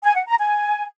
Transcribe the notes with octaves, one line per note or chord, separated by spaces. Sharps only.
G#5
F#5
A#5
G#5